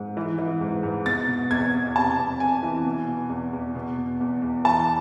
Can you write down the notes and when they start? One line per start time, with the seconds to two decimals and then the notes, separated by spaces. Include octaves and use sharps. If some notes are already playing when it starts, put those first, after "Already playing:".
Already playing: G#2
0.17 E3
0.38 E3
0.61 G#2
0.83 G#2
1.06 B2 A6
1.28 B2
1.51 E2 G#6
1.73 E2
1.96 C3 A5
2.18 F2
2.40 F2 G#5
2.63 E3
2.85 B2
3.08 B2
3.30 E2
3.53 E2
3.75 B2
3.98 B2
4.20 E2
4.42 E2
4.64 E3 A5